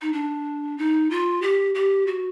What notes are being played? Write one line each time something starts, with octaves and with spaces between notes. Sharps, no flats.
D#4
D4
D#4
F4
G4
G4
F#4